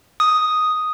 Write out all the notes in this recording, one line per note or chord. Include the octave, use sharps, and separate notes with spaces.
D#6